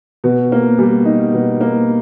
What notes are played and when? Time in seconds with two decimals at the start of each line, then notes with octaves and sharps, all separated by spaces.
0.24 B2
0.52 A#3
0.78 G3
1.05 D#4
1.33 B2
1.60 A#3